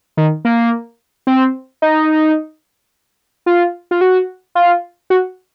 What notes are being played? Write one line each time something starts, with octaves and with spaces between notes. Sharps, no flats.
D#3
A#3
C4
D#4
F4
F4
F#4
F4
F#4